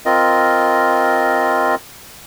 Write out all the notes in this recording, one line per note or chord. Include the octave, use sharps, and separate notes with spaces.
C4 F4 A#4 D#5